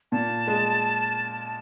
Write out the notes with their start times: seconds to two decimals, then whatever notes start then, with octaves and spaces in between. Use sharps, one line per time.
0.12 A#2 A5
0.48 G#3